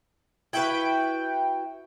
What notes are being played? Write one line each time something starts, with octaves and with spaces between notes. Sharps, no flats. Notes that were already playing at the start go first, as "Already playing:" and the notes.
E4 F#4 B4 G5